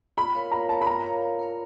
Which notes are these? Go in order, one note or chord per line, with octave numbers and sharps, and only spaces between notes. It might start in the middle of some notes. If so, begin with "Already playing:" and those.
F4 B5
A#4 C#5 F5
F4 A#5
A#4 C#5 F5 A5
B5
F4 A#5
A#4 C#5 F5
F4
A#4 C#5 F5